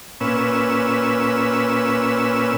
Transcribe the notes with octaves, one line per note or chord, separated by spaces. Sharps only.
A#2 C#4 B4 E6